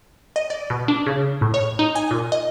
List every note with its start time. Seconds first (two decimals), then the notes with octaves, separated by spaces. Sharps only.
0.36 D#5
0.50 D5
0.70 B2
0.88 D4
1.06 C#3
1.41 A2
1.54 C#5
1.79 D#4
1.95 G#5
2.11 A#2
2.32 D#5